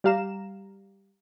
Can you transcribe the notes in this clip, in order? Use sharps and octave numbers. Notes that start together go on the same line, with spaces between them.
G3 G4 F5 A#5 E7